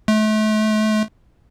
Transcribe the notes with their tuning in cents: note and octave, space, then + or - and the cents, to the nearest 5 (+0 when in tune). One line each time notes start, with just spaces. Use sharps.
A3 -35